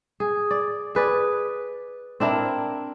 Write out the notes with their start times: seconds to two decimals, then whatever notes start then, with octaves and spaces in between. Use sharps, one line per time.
0.20 G#4
0.51 D5
0.95 G#4 B4 D5
2.20 C4 D4 E4 A#4